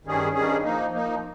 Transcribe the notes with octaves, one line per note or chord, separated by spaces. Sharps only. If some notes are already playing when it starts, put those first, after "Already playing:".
G2 D#3 G3 C#4 G#4
G2 D#3 G3 C#4 G#4
F3 A#3 D#4
F3 A#3 D#4